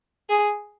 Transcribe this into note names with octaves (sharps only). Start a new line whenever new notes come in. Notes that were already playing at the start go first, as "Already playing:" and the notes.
G#4